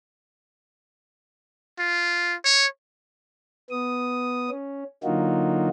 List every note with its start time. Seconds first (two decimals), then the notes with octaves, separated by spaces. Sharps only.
1.79 F4
2.45 C#5
3.70 B3 D#6
4.50 C#4
5.04 D3 F#3 A#3 D#4 F4 F#4